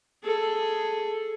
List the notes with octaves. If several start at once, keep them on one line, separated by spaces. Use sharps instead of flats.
G#4 A4